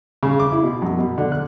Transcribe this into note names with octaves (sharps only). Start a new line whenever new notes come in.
C#3
D6
E4
B2
F#2
B2
D3
F#6